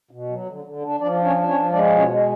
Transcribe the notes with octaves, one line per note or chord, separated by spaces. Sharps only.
B2
F#3
D3
D3
D4
F3 D4 D5
D4
C#4 C#5
D4
C#4 C#5
F3
G#3 D4 D5
B2
C#4 C#5
G#3